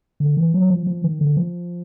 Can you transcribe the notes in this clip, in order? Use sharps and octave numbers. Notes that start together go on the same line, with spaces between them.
D3
E3
F#3
F3
F3
D#3
D3
F3